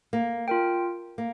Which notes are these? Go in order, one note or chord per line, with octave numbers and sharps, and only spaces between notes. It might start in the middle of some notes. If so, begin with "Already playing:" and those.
A#3
F4 A#4 G5
A#3